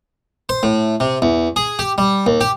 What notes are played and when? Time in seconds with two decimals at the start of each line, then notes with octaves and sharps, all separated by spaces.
0.49 C5
0.63 A2
1.00 C3
1.22 E2
1.56 G#4
1.79 G4
1.98 G3
2.26 D#2
2.41 G4